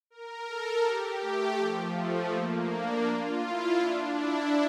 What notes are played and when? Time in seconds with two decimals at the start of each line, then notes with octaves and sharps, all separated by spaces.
0.10 A#4
0.47 A4
0.84 G4
1.22 A3
1.58 F3
1.95 A3
2.33 A#3
2.70 D4
3.06 F4
3.44 E4
3.80 D4
4.18 E4